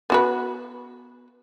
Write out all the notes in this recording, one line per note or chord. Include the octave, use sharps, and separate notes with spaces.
B3 F#4 B4